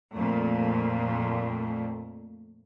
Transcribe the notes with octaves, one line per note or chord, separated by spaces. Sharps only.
F2 A#2 A3